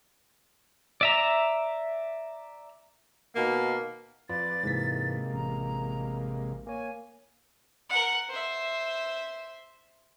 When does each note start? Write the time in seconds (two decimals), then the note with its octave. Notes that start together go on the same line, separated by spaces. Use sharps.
1.01 D5 E5 A#5
3.36 B2 D#3 A#3
4.29 F2 F4 B4 D5 A6
4.64 G#2 C3 E3 G#3 A#3 B6
5.33 A1 A#5
6.67 A#3 C#5 G#5
7.89 A#4 F#5
8.30 C5 E5